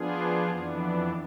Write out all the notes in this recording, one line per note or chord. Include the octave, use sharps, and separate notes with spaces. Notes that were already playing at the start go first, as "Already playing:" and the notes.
Already playing: F3 B3 D4 F4 G#4
F2 E3 B3 D4